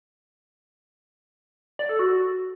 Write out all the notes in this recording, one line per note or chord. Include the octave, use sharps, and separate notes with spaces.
D5
A4
F#4